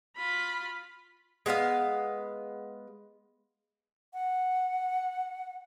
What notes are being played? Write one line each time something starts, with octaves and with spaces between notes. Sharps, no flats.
F4 B5
G#3 B3 B4 F5
F#5